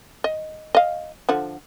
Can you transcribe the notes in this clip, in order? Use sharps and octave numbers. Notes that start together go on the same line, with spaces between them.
D#5
D#5 F5
D3 F3 F#5